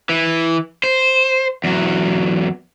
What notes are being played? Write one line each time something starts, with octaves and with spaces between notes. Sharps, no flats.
E3
C5
E2 F#3